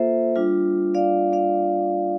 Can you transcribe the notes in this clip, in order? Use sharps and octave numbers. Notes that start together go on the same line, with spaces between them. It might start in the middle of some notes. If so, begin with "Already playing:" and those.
Already playing: A#3 F4 A4 C5 E5
G3 D4 F4
D5 F5
D5 F5